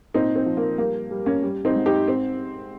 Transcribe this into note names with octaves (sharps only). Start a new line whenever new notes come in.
A#2 C4 D#4
C4
F3
A#3
G3 A#3
G3
A#3 C#4
G3
C4 D#4
G#2
D#4 G4
C4